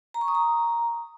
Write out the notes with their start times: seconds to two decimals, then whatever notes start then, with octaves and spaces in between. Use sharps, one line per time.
0.14 A#5
0.21 C#6
0.28 D#6
0.35 A#5